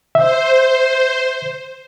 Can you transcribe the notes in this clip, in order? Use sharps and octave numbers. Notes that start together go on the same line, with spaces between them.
C5 E5